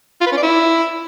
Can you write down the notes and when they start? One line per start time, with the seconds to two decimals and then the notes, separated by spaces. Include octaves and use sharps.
0.21 F4
0.26 B4
0.32 C#4
0.37 D5
0.43 E4